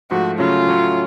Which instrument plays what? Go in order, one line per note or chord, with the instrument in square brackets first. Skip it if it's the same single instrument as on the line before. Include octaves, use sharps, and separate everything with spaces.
[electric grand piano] G#2 F3 A3 [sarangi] F#4
[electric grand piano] C#3 F#3 A3 C#4 [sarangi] F4
[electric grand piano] A2 F#3 A3 C#4